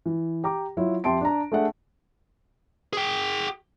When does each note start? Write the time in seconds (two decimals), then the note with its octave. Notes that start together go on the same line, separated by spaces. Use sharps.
0.06 E3
0.44 G4 A#5 D6
0.77 F#3 E4 F4
1.04 F2 G4 E5 A5 C6 D7
1.21 D4 A#5
1.52 A3 D4 G#4 E5 F#5
2.93 G#4 G5